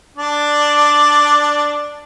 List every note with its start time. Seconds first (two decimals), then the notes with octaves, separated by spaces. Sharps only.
0.17 D4 D5